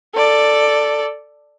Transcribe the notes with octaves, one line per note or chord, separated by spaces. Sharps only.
A4 D5